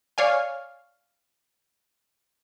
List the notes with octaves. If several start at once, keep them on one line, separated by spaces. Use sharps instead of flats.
C#5 D5 F5 G#5